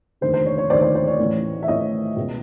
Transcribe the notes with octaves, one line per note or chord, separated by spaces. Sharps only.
F1 D#2 D3 C5
C5
C#5
C#5
F1 D#2 D3 C5 D5
C5 D5
C5
C#5
A1 A2 E3
E5
A1 A2 E3 C#5 D#5
C#2 B2